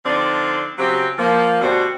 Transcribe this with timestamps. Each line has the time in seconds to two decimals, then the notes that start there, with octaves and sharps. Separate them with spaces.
0.05 D3 F3 C4 D4 D#4 D5
0.78 C#3 F#3 C4 G4
1.18 F3 A#3
1.60 D2 B2 D4 F#4 G4 C5